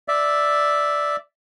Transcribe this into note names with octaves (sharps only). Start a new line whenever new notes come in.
D5 E5